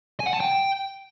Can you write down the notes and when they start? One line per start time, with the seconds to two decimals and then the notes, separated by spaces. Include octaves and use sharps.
0.20 G#5
0.27 F#5
0.34 A5
0.40 G5